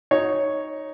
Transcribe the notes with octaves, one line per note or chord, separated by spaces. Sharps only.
D#4 C#5